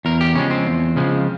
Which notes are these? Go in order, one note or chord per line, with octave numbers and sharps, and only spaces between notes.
E2 A#4
G4
C#3 F3 G#3 C#4
C4
E2
C#3 F3 G#3